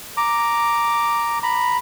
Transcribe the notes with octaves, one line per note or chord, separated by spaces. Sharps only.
A#5 D6
A#5 B5